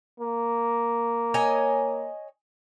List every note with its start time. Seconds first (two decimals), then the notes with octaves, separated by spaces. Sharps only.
0.20 A#3
1.34 C#5 D#5 G#5